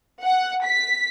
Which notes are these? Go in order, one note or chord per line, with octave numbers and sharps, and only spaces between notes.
F#5
B6